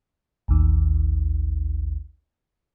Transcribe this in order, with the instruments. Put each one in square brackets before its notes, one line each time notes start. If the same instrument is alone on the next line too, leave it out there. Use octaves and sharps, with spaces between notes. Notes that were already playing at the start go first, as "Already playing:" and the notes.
[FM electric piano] A1 D#2